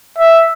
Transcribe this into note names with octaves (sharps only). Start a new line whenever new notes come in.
E5